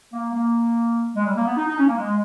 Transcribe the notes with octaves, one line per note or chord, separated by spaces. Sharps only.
A#3
A#3
G#3
G3
A#3
B3
D#4
D#4
C#4
A#3
G#3